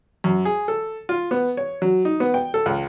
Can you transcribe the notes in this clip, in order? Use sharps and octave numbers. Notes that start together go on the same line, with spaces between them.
F#2
G#4
A4
F4
B3
C#5
F#3
D#4
B3
G5
A4
C#2